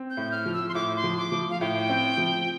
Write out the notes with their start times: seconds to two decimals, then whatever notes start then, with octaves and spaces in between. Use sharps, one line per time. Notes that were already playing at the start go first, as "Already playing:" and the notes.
Already playing: C4
0.10 G6
0.17 A2
0.31 F6
0.46 F3
0.53 E6
0.69 C6
0.74 A2 D6
0.96 C6
1.04 F3
1.18 D6
1.32 F3
1.50 F5
1.61 A2 G5
1.90 C4
2.17 F3